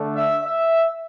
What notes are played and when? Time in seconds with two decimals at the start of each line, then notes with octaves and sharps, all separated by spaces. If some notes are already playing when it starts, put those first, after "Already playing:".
Already playing: D3 A3 D4
0.16 E5
0.43 E5